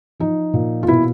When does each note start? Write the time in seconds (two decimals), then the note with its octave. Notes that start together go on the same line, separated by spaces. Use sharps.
0.20 F3 D#4
0.53 A#2
0.83 F4
0.88 B2 E4